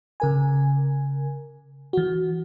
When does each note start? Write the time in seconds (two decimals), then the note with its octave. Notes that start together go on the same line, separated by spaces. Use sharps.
0.20 C#3 A#4 G#5
1.93 E3 F#4